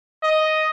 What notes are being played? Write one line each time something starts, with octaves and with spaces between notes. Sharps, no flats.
D#5